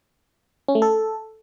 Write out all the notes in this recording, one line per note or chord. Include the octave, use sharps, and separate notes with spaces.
C#4
A3
A4